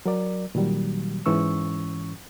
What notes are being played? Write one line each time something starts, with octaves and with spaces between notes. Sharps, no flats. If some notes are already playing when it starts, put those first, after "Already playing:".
F#3 A#4 D5
A#2 D#3 F#3 G3
G#2 E3 C#4 C#6 E6